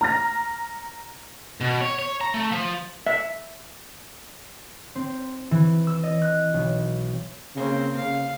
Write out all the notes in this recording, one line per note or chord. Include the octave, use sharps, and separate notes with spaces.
A#5 F6 A#6
B2
C#5
C#5
A#5
A3
F3
E5
C4
E3
E6
D#5
F#6
B1
C#3 A#3 C4
C#3 F5